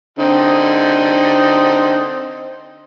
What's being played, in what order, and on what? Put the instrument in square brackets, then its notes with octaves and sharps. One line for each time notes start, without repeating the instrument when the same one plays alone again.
[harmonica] D3 C4 D#4